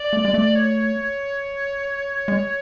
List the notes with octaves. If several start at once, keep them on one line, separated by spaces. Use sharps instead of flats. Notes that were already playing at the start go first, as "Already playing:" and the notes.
Already playing: D5
A3
G#3
A3
C#5
G#3